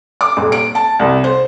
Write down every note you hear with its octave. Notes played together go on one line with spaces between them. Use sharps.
D6
D#1
D7
A5
C2
C5